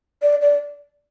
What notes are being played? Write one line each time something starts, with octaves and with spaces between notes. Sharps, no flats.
D5
D5